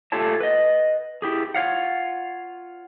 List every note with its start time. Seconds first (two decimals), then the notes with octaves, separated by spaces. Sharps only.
0.12 A3 F4 G4 A4 C#5 A5
0.41 B4 D#5
1.22 E4 G4 G#4
1.54 F4 C#5 F5 F#5